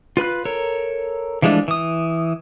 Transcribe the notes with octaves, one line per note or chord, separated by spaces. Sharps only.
F4 B4 B5 F#6
A4 A#4 C#5
E3 F3 G#3 A3 D4
E3 D#6